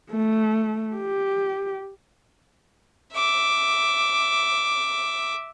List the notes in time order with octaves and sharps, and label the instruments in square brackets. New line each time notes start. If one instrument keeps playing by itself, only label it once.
[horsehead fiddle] A3
G4
[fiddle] E5 D6